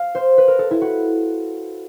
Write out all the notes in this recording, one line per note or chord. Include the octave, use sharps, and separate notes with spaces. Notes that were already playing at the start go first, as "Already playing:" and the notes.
Already playing: F5
C5
B4
A#4
A4
E4
F#4